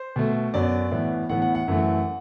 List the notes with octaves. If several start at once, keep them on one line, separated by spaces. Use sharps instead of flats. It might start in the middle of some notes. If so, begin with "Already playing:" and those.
Already playing: C5
B2 A3
F#2 F#3 B3 D5
A2 E3 B3
A2 E3 B3 F#5
F#5
F#5
F#2 E3 A3